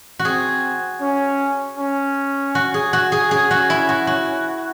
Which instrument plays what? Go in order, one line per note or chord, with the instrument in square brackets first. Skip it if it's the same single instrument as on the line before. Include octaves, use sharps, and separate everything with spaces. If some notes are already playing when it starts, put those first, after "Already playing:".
[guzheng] F#4
[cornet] C4 [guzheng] G#4
[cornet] C#4
C#4
[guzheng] F#4
G#4
F#4
G#4
[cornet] C#4 [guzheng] G#4
[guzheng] F#4
E4
F#4
F#4